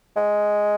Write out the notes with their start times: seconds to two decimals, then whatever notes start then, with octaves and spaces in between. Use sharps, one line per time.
0.16 G#3